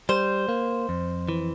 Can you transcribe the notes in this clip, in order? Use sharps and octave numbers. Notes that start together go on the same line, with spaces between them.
G3 C5
A#3
F2
E3